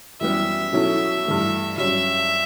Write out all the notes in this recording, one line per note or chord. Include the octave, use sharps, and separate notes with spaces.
F#2 E3 G3 B3 E5
B2 F#3 C#4 E4 A4
G2 E3 A3
G2 F#3 C#4 E5